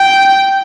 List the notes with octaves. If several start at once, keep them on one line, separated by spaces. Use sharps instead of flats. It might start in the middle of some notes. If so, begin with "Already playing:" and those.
Already playing: G5